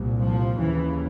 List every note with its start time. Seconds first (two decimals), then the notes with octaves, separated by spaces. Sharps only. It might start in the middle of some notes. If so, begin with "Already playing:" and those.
Already playing: C2 A#2
0.19 F3
0.58 D#2 C#3 E3